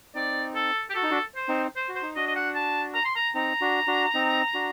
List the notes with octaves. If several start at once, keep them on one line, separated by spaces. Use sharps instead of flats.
C4 D#4 D5
A4
G4
F#4 A4
D#4
D4 F#4
C5
C4 D#4
C5
F#4
C5
D#4
D4 F#4 D#5
D#5
F#5
A5
A#5
C6
A#5
C4 D#4 A#5
D4 F#4
D4 F#4
C4 D#4
D4 F#4